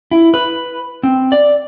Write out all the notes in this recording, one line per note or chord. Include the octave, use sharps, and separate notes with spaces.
E4
B4
C4
D5